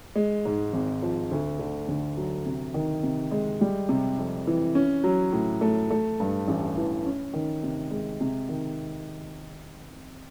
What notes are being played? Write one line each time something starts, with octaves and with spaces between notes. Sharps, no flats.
G#3
G#2
G#1
F3
D2
D3
D2
F#3
C3
D#3
C3
G#3
G3
C3
F2
E3
C#4
F#3
A2
A3
A3
G2
A1
E3
C#4
D#3
C3
G#3
C3
D#3